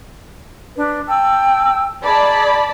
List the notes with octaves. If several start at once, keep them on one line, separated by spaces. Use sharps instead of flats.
D4 B4
G5 A5 E6
D#4 G#4 D5 A5 B5